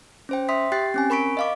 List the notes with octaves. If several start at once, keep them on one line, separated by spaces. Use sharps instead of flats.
C#4 C5 G5
E5 C6 D#6 B6
G4 G5 F#6 A6 C7
C4 C#4 G#5
A#4 B5 C#6 B6 D7
D#5 F5 D6